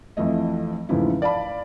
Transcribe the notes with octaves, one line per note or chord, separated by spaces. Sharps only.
F2 E3 F3 A3 D#5
E2 G#2 C#3 F3 A3 E4
D5 F5 A5 B5